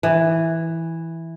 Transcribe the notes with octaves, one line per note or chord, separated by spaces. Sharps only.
E3